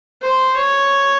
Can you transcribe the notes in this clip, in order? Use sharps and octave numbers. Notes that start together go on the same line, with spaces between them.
C5
C#5